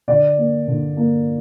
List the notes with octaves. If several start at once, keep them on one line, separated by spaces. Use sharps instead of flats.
D3 D5
A#3
D3
A#3